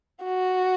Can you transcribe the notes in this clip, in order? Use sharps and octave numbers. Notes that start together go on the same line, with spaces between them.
F#4